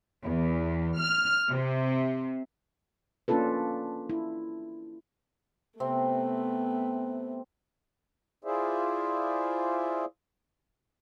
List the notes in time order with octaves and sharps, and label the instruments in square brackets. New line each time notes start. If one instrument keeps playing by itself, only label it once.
[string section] E2
F6
C3
[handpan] A#3 C#4 D4 F4 A4 B4
E4
[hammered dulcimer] C3 C4 [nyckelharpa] A3 B3
[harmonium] E4 F4 G#4 C5 D5 E5